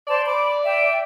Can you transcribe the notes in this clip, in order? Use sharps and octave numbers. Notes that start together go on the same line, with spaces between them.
C5 D5 A5
B5 D6
E5 G5